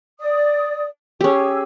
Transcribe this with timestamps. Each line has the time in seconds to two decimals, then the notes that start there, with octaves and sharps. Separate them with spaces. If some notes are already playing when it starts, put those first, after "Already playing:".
0.19 D5 D#6
1.21 C#4 G4 G#4 E6